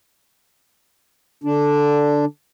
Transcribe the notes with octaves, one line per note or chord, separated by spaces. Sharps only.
D3 D4